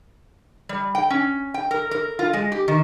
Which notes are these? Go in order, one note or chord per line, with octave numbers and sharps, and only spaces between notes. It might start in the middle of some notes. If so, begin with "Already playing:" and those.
G3
G5
C#4
G5
A#4
A#4
F4
G#3
G4
D#3